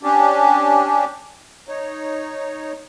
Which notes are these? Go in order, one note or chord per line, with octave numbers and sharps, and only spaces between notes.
C#4 D4 G4
D#4 C#5